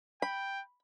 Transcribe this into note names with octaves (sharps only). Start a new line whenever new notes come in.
G5 B5